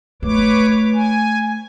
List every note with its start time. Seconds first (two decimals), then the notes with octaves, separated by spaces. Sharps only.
0.22 A3 B4 C#5 D6
0.93 G#5